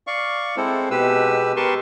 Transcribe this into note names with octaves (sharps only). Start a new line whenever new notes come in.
D5 F5 C#6
G#3 C4 E4 A4 C5
B2 G#3 G4 B4 E6
G4 A#4 B4 A5 C6 C#6